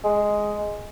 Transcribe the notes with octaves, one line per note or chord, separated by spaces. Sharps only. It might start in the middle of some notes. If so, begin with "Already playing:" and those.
G#3